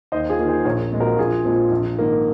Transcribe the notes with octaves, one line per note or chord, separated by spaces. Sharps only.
D#2 C5 D#5
F4 G#4
D#3 A#3
G#4 C5
A#1 A#4 C#5
A#2 G#3 C4
F#4 A#4
A#1 F4 G#4
A#2 F3 G#3 C4
A#1
G#2 D#3 A#3